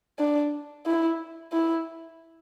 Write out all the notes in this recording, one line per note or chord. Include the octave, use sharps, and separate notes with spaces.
D4
E4
E4